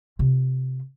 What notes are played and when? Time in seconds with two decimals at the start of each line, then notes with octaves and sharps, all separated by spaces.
0.19 C3 F4